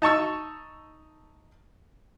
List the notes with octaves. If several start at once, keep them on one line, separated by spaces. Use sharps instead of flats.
D#4 A5 C#6 E6